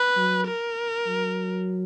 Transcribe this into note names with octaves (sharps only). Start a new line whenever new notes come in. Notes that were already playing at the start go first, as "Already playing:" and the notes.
Already playing: B4
F#3
A#4
F#3